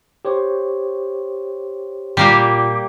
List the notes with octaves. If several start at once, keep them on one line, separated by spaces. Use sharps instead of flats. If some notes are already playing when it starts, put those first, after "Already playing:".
G4 C5 C#5
A#2 G3 A#3 G4